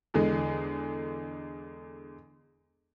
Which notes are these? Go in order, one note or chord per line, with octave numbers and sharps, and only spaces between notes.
E2 D3 G#3